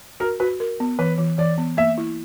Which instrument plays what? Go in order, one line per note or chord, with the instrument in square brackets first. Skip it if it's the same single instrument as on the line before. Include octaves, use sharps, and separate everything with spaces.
[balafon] F#4 [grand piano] A#4
[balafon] F#4 [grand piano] B4
[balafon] A#4
B3
[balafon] E3 [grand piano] B4
[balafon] E3
[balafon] E3 [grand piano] D5
[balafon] B3
[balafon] A#3 [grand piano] E5
[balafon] E4